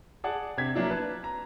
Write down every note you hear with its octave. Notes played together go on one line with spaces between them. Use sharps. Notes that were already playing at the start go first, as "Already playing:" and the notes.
G#4 D5 F#5 A5
C3 D4 G#6 B6
F#3 A#3 D4 E4
B4 A5
A#5